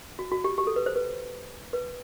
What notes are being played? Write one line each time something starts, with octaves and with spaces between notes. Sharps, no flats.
F#4
F#4
G4
G4
A4
B4
C5
B4
B4